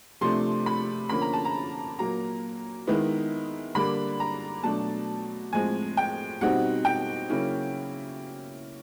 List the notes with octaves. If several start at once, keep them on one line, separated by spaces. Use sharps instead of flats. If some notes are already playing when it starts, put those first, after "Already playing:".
C3 F3 A3 D4 C6
B5
D3 F3 A#3 C#4 B5
A#5
A5
A#5
A#2 F#3 A#3 A#5
D#3 G#3 B3 E4
D3 G3 A#3 D4 B5
A#5
B2 F#3 A3 D4 A5
A2 F3 G#3 C4 G#5
G5
B2 G3 C4 D#4 F#5
G5
C#3 F#3 A#3 C#4 E4